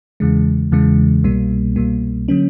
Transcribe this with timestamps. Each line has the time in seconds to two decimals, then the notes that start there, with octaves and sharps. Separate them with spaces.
0.20 E2 C#3 E3 G#3
0.72 E2 C#3 E3 G#3
1.24 C2 B2 G3 A#3
1.76 C2 B2 G3 A#3
2.28 D3 F#3 A#3 C#4